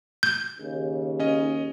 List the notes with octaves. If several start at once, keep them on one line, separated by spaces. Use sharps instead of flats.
G6
D#2 C#3
C#4 D#5